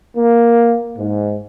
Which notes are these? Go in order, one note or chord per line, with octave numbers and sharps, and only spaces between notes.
A#3
G#2